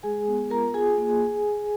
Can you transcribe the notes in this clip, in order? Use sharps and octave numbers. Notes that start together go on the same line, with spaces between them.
G#3 G#4 G#5
B3
F4 A#4 A#5
F4 G#4 G#5
A#3